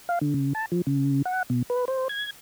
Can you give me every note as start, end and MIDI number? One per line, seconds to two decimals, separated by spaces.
0.09 0.19 77
0.21 0.34 50
0.34 0.53 49
0.55 0.66 81
0.72 0.82 53
0.87 1.22 49
1.25 1.43 78
1.50 1.62 47
1.70 1.85 71
1.88 2.08 72
2.09 2.30 92